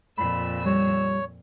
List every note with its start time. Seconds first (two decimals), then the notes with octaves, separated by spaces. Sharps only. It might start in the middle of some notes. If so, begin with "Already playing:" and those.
0.18 F2 A#2 B5 E6
0.66 G3 C#5